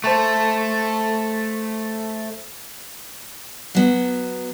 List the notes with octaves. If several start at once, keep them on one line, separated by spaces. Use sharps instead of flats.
A3 C5 A5 C#6
F#3 B3